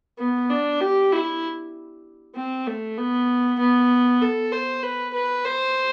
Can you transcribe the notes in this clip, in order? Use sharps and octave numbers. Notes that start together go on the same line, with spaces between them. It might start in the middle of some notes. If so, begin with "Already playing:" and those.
B3
D4
G4
E4
C4
A3
B3
B3
A4
C5
B4
B4
C5